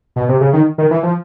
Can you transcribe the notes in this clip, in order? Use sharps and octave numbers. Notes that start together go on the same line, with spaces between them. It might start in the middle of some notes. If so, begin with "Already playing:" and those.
B2
C3
C#3
D#3
D#3
E3
F3